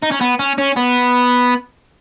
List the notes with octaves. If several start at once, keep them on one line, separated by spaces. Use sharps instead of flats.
D#4
C#4
B3
C#4
C#4
B3